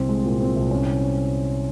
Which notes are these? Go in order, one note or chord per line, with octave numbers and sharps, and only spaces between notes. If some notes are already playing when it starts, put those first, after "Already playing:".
Already playing: C2 C4
G#3
A#2
C4
C2
C#4